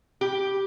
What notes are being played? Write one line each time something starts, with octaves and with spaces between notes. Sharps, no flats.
G4